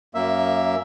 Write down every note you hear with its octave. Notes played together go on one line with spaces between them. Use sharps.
F#2 A#3 E5